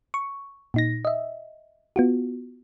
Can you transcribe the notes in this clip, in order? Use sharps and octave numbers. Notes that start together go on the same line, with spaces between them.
C#6
A#2 D#4 A#6
D#5 E5
B3 F4 F#4